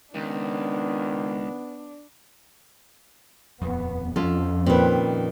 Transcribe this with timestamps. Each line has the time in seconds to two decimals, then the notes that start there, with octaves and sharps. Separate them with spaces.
0.15 C#2 D#3 B3 D4
3.62 D#1 F2 B3
4.16 F2 F3 C#4 F4 A4
4.66 A#2 D#3 C4 B4